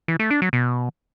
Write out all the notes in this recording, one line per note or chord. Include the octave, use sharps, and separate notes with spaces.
E3
A3
D4
F#3
B2